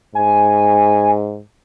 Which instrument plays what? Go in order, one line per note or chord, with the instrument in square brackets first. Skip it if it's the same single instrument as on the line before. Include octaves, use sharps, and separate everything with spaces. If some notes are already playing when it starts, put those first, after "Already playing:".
[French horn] G#2 [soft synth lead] G#5